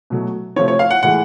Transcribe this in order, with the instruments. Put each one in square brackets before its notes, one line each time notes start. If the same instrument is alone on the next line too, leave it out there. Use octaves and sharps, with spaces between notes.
[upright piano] B2 F#3 A3
C3 F3 A3 C#5
C#5
F5
F#5
A2 E3 G#3 F#5